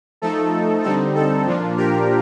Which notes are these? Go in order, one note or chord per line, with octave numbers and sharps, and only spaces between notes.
F3 A3 D#4 A4
D3 G3 C4 D#4 A4
A4
A#2 F3 A#3 D4 F4
G4 A#4